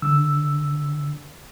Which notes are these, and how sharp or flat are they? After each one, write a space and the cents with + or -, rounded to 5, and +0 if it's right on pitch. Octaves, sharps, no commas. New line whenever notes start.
D3 +0 E6 +0